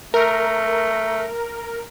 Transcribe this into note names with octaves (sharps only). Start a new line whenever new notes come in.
A3 A#4